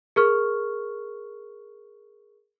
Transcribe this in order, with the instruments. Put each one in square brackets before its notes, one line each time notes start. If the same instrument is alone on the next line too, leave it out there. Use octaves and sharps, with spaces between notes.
[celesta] G#4 A#4 C#6 F6